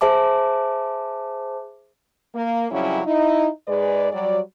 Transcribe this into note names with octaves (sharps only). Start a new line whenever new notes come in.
G#4 C5 E5 A5 D6
A#3
F2 C#3 F#3 G3 C#4 E4
D#4 E4
G#2 G#3 G#4 B4 D5
F#3 G3 D5